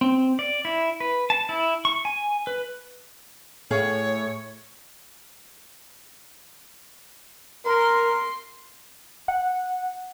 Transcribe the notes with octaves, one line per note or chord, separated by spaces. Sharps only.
C4
D5
E4
B4
A5
E4
C#6
G#5
B4
A2 G#4 C#5 F5
A#4 C6
F#5